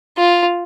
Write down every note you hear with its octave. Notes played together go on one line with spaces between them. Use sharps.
F4